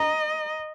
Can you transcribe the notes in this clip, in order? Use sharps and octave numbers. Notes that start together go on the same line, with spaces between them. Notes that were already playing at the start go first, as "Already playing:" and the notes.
Already playing: D#5 A#5